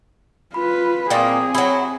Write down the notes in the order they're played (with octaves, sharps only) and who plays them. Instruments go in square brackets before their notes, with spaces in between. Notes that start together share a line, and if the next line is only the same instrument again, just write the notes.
[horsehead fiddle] F4 B4 [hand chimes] B5
[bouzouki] A#2 A#3 [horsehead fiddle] C4 G#4 [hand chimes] G5 D#6
[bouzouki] F#3 E4